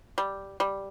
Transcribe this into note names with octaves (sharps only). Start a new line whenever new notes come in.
G3
G3